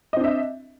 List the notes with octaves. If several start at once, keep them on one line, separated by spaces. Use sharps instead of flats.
C4 D4 D#5 E5